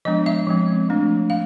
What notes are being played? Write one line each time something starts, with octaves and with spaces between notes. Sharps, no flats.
F3 G#3 B3 D4 D#5
E5
F3 G#3 C4
F3 A3 D4
F5